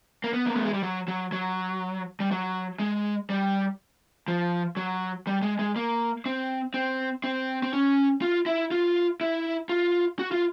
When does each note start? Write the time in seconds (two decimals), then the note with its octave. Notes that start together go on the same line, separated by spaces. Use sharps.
0.24 A#3
0.33 B3
0.47 A#3
0.56 A3
0.65 G#3
0.74 G3
0.83 F#3
1.08 F#3
1.32 F#3
2.20 G3
2.31 F#3
2.79 G#3
3.30 G3
4.28 F3
4.77 F#3
5.27 G3
5.42 G#3
5.59 G#3
5.76 A#3
6.26 C4
6.74 C4
7.24 C4
7.63 C4
7.73 C#4
8.22 F4
8.46 E4
8.71 F4
9.21 E4
9.69 F4
10.19 F#4
10.32 F4